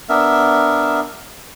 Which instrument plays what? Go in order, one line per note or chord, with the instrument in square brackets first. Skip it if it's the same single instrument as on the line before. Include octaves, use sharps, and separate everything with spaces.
[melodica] B3 D4 A#4 E5